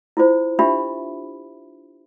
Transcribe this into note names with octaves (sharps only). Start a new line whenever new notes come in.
E4 F4 C5
D4 F4 G4 E5 B5